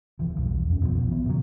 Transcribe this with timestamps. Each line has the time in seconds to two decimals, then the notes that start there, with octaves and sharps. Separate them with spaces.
0.19 E1 E3 F3
0.36 B1 E2 G2
0.70 F2 C#4
0.82 A#1 B2 D3 F3
1.11 E3 B3
1.25 A#2 C#3 F#3